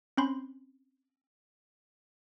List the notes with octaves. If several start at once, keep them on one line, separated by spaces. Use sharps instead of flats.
C4 C#4 B5 C6